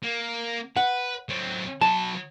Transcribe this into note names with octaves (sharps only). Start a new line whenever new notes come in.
A#3
B4 F#5
F#3 C4
F#3 B4 A5